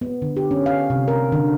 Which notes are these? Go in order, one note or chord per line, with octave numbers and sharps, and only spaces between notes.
B3
D3
G4
C#4
F5
C3
A#4
D3